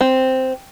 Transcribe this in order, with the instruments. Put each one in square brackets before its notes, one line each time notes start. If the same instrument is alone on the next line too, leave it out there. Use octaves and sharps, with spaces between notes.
[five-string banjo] C4